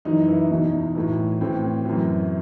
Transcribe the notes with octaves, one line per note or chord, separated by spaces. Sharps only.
F#2 E3 D#4
E3 E4
E2 B2 D#4
A2 E3
A2 E3 C4
F#2 E3